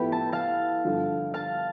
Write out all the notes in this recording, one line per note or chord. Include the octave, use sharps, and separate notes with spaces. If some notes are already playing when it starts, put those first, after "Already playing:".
Already playing: A2 F3 B3 E4 G4 A4 B4
A5
F5 A5
G2 D3 F3
F5 A5